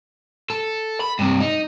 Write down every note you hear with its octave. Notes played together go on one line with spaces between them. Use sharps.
A4
B5
G2 C3
D#4